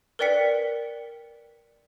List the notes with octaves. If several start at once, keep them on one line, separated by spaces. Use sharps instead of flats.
A#4 B4 D5 G5 B6 C#7